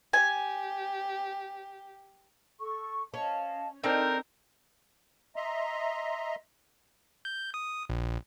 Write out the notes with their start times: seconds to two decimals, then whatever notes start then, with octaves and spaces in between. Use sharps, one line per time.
0.13 G4 G#5
2.60 A4 C#6
3.14 C#4 D#5 F5 A5
3.84 C4 D4 D#4 A4 A#4 G6
5.36 D#5 E5 A#5 C6
7.25 G6
7.54 D#6
7.89 A#1